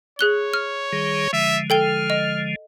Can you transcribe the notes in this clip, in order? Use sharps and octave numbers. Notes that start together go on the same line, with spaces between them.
G#4 C#5 F#6 G7
F6
D#3 G3 G#4
D3 F3 G#3 E5
A4 G5 F6 G7
D#5